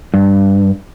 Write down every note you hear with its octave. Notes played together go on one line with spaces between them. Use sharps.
G2